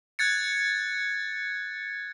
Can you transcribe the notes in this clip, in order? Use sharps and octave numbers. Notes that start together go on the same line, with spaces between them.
F#6 G#6 A6 C#7